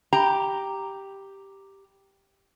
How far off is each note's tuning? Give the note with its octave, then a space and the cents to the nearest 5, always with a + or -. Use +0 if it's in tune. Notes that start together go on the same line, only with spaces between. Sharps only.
G4 +0 A#5 +0